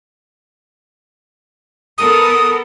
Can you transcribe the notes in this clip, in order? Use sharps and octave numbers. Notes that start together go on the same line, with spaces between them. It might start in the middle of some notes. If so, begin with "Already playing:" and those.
B3 A4 A#4 D#6